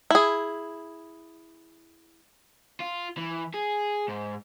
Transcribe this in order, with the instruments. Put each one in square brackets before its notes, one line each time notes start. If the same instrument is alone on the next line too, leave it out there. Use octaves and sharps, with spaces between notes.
[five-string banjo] E4 G#4
[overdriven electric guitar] F4
E3
G#4
G#2